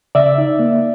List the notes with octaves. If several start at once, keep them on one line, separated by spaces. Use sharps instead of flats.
C#3 D5 E5
D#4
A#3